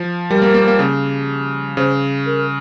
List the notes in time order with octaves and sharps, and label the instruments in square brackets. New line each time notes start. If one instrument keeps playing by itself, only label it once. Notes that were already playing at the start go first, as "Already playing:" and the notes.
Already playing: [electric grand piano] F3
[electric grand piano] G3 [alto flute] A#4
[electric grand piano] A#3
A#3
A#3
C#3
[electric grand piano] C#3 [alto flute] C5
[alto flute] A#4